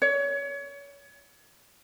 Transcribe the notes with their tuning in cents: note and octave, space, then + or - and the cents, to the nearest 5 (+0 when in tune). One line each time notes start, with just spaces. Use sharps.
C#5 +30